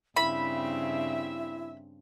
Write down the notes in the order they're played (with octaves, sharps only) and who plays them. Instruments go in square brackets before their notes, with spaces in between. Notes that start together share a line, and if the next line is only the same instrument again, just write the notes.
[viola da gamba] G2 C#3 C4 [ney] E4 [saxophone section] E5 [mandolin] B5